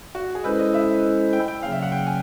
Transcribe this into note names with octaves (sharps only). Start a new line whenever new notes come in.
F#4
G#4
G#3 C#4 E4 A4 B4 C5
D#5
E5
G5
G5
C#3 F#3 A#3 C#4 F5
E5
F#5
G5
G#5